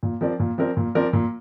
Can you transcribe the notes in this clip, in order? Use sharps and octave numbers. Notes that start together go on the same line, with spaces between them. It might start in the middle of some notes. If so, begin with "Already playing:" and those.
A#2
F3 C4 A#4 D5
A#2
F3 C4 A#4 D5
A#2
F3 C4 A#4 D5
A#2